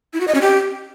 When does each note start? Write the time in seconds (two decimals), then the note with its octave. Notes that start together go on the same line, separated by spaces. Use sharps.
0.13 E4
0.20 F#4
0.27 D#5
0.34 C#4
0.41 G4